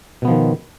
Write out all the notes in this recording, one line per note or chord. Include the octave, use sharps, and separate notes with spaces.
B2 D#3 F3 B3